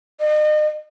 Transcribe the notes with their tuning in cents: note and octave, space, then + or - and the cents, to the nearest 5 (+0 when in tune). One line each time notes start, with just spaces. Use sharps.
D#5 -40